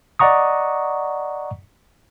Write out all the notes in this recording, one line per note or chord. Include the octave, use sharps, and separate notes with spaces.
D5 D#5 F#5 A#5 C#6 D#6